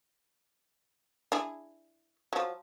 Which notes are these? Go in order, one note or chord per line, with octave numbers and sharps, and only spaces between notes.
D4 E4 G#4
F3 F#3